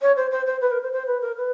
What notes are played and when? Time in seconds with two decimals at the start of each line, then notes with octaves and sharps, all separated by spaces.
0.01 C#5
0.16 C5
0.31 C5
0.46 C5
0.61 B4
0.71 A#4
0.82 C5
0.92 C5
1.06 B4
1.21 A#4
1.37 B4